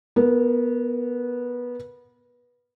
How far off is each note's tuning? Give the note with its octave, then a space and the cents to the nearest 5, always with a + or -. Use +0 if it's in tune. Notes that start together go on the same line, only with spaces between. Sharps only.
B3 -15 A#4 +0